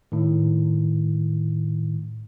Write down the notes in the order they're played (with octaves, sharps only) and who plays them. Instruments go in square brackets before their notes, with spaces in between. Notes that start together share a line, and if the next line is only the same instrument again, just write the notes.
[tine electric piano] A2 D#3